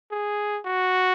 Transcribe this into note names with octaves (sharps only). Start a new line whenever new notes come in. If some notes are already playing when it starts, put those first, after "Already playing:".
G#4
F#4